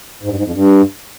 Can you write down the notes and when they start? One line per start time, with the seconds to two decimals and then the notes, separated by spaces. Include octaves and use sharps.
0.23 G#2
0.30 G2
0.37 G#2
0.46 F2
0.54 G2